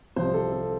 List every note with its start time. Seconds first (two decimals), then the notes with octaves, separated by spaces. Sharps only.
0.16 C2 C3 F3 C5
0.34 A4
0.52 A4